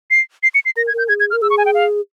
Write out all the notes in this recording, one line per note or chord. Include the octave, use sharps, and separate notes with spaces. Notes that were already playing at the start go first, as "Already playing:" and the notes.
C7
C7
C#7
C7
A#4 A#6
G#6
A#4
G6
G#4 G#6
G#6
A#4 F6
G#4 E6
C#6
G#5
G5
F5